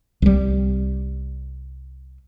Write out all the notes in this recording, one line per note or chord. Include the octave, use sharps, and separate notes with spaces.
C2 G3